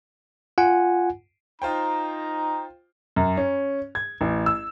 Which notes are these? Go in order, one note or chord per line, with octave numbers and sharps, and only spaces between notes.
F4 F#5 G#5
D#4 F4 C5 G5 A#5
F#2
C#4
G#6
A1
E6